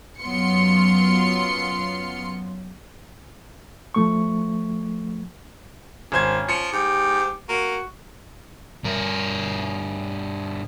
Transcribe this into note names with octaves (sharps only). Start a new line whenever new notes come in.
F#2 F#3 B3 F4 C6 C#7
F3 A3 C#6
G#1 C#4 C5 G#6
F3 C#7
G#2 G4
A#3 F#4
G2 A#4